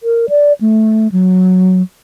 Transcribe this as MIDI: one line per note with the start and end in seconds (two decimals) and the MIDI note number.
0.03 0.26 70
0.29 0.53 74
0.61 1.11 57
1.12 1.82 54